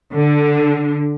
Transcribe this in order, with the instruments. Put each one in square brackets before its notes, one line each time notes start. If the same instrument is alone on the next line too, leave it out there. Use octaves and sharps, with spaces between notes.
[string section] D3